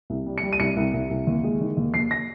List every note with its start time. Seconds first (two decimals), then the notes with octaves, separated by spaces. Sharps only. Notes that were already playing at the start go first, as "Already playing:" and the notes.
0.10 C2
0.26 G3
0.38 C#7
0.43 G3
0.53 D#7
0.60 C2 C#7
0.77 C2
0.94 C2
1.11 C2
1.27 D#2
1.44 G#3
1.60 D#3
1.77 D#2
1.94 D#2 C7
2.11 A#6